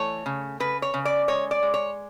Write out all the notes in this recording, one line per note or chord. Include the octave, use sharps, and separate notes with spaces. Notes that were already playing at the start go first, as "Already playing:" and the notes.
Already playing: E3 A3 C#5
C#3
C#3 B4
C#5
C#3
D5
G#3 C#5
D5
G#3
C#5